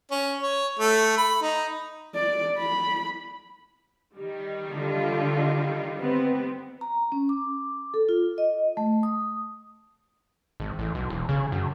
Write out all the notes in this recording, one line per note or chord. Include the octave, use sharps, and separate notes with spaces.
C#4
C#5
A3
B5
D#4
D5
B5
D#3 G3
D3 F4
B3 C4
A#5
C#4
D6
A4
F4
D#5
A3
D#6
G#1
A1
B1
E1
C#3
F#2